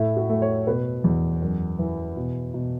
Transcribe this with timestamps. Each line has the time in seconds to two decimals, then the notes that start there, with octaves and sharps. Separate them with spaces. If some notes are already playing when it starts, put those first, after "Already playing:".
Already playing: A2 A3 E4
0.17 F#4
0.29 A3
0.42 C#5
0.67 B2 B4
1.04 E2
1.42 F#2
1.79 E3
2.17 B2
2.54 B2